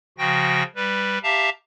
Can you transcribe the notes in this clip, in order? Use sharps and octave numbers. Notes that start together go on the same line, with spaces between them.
C#3 F3 F#4 G5 A#6
G3 B4
G4 E5 F5 A5 A#5